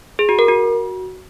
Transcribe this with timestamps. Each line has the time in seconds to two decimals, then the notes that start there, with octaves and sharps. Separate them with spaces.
0.19 G#4
0.29 F#4
0.39 A#4
0.48 F#4